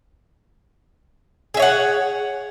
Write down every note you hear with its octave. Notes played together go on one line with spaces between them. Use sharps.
G#4 C#5 E5 F#5